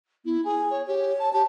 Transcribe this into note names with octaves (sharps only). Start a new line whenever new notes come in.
B3 E4
G#4 G#5
C#5
G4 C#5
A5
G4 A5